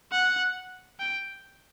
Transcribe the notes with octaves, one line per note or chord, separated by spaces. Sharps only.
F#5
G5